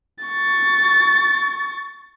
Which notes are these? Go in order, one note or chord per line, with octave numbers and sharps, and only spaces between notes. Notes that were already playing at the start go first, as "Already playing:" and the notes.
C#6 A6